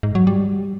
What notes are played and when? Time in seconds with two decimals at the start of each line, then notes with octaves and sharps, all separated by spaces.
0.03 G#2
0.15 F#3
0.27 G3